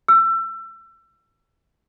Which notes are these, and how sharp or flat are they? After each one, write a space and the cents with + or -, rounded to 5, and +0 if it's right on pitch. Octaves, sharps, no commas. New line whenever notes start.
E6 +30